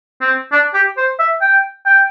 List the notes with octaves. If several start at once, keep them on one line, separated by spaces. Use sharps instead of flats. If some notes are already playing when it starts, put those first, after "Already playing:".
C4
D4
G4
C5
E5
G5
G5